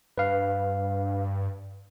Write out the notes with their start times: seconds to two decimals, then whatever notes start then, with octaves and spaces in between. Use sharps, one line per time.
0.18 G2 B4 F5